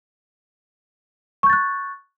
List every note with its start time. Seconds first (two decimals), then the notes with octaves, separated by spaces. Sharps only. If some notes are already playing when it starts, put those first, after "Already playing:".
1.43 C#6
1.46 G6
1.50 A6
1.53 F#6